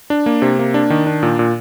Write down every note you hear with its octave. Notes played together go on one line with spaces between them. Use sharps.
D4
A#3
C3
A#3
D4
D#3
D4
A#2
A#2